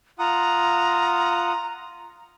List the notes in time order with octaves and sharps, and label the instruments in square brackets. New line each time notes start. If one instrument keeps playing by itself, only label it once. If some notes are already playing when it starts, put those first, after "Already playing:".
[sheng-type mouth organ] F4 F#5 D#6 [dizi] A#5